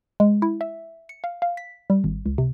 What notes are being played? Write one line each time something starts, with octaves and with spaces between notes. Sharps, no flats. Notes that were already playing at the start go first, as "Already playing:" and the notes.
G#3
E4
E5
C#7
F5
F5
B6
G3
G#1
C#2
C3